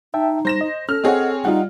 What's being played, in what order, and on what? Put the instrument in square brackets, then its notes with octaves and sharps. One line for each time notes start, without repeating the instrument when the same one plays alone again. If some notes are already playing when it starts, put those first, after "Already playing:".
[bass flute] D#4 [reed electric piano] E5 G5 A5
[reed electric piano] G3 [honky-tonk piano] C5 A#6 E7
[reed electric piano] D#5
[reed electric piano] C#4 [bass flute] A4 [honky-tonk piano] F6
[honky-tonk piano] C4 G#4 C#5 [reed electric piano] D#5 F#5
[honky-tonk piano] G3 F4 [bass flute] D#4 [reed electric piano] D#5 F#5